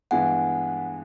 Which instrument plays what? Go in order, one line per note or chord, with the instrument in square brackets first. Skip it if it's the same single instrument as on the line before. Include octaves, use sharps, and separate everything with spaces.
[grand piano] G2 E3 G#3 B3 [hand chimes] F#5 G#5